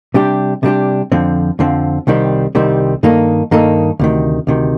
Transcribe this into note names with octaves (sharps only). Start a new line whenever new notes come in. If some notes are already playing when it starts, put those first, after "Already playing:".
C3 G3 D4 G4
C3 G3 D4 G4
F2 D3 F3 C4
F2 D3 F3 C4
C2 C3 D#3 G3 C4
C2 C3 D#3 G3 C4
G2 D#3 A#3 D#4 A4
G2 D#3 A#3 D#4 A4
D2 C3 D#3
D2 C3 D#3